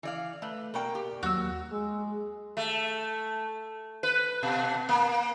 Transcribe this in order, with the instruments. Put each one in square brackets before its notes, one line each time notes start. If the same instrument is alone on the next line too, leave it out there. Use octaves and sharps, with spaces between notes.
[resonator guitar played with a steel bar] E3 D5 F5
A3 B4
[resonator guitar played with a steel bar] B2 A#3 G5 [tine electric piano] A#4 D5 C#6
[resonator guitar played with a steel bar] G4
[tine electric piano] D#2 F#3 A#3 [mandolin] F#4 E6
[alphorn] G#3
[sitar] A3
B4
B2
A#3